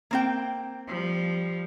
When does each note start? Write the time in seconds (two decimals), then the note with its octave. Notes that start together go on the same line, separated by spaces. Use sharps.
0.11 A#3 C4 G5
0.87 F3 G3